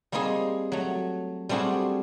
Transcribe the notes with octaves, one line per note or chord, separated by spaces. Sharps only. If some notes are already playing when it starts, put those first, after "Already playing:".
G3 A#3 C4 D#4 G#4
F#3 A3
G3 A3 C4 D4 F#4 G#4